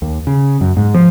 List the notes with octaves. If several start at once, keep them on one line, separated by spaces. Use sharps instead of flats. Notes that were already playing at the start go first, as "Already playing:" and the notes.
D#2
C#3
F#2
G#2
F3